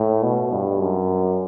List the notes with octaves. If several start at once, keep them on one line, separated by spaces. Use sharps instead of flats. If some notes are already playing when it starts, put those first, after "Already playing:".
Already playing: A2
B2
G2
F#2